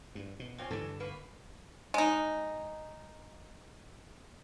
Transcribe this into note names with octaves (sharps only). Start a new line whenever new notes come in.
G2
B2
A#2 C4 C#4
G2 D3 E3 A4
A#3 B4
G#3 D#4